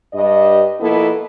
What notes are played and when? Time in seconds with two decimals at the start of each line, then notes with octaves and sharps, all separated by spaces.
0.13 G2 D#5
0.80 B2 F3 A#3 B3 E4 A4